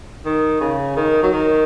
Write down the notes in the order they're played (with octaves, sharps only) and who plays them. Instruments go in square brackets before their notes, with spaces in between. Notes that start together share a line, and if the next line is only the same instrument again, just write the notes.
[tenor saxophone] D#3
C#3
D#3
F#3
D#3